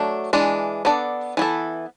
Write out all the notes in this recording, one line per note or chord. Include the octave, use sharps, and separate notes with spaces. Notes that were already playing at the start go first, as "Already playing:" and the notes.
Already playing: F#3 A3 D4
E3 G#3 D4
B3 D4 A4 D5
E3 B3 E4 A4